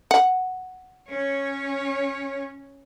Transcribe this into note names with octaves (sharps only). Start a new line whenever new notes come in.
F#5
C#4 C#5